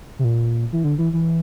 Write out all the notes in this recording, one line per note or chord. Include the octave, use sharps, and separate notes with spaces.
C3
A#2
E3
D3
E3
E3